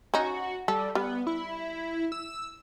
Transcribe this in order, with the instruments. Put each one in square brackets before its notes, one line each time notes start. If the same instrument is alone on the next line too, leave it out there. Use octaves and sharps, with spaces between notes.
[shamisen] C#4 D#4 [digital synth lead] F#4
[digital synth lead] G3 [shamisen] A4
[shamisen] G3 [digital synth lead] B3
[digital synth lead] E4
E6